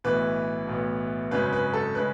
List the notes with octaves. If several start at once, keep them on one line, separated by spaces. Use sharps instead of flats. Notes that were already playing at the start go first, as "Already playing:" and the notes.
B1 A2 E3 B3 B4
B1 A2 E3 B3
G#1 F#2 C#3 G#3 C#4 B4
B4
A4
C#3 G#3 C#4 B4